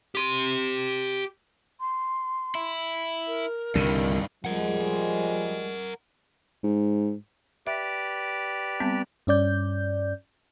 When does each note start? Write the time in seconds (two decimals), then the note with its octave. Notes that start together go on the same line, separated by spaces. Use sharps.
0.15 G4 C6
1.80 C6
2.55 E4
3.27 A#4
3.75 C2 G2 D3 D#3
4.45 F3 G3 G#3 A#4 F#5
6.63 G#2
7.67 G4 B4 D5 E5
8.80 G3 B3 C4
9.27 G2 C#4 D5 G6